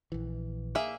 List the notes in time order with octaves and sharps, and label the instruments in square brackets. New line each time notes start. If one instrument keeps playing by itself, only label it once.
[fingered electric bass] A#1 E3
[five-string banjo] A#3 G#4 E5